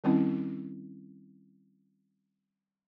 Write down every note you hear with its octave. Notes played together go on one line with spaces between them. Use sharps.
D#3 G3 C4 C#4 E4